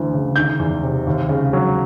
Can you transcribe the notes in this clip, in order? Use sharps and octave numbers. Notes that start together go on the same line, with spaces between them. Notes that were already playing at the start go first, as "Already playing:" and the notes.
Already playing: D2 E3
C#3
D#3 G6
E2
C3
D#2
C#3
F#3